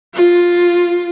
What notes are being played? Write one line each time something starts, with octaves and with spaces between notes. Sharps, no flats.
F4